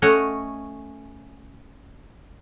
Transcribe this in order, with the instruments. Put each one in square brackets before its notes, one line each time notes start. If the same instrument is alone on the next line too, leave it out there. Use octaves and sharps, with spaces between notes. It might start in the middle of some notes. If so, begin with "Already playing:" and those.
[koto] A3 C#4 C#5 D#5 F#5